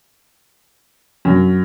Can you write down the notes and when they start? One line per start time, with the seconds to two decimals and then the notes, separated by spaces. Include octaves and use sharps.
1.25 F#2